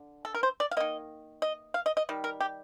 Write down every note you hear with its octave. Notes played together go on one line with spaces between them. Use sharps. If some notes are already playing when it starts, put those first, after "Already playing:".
Already playing: D3
A4
A#4
C5
D5
F5
D#3 A#3 D#5
D#5
F5
D#5
D#5
D#3 G3
A#4
G4